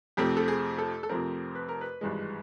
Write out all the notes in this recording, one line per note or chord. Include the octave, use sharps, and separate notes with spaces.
F2 C3 F3 A3 C4 G4
A4
G#4
A4
A4
F2 C3 F3 A3 C4 A#4
B4
A#4
B4
G#1 G2 E3 G#3